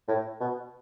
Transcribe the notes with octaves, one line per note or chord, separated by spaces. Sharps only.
A2
B2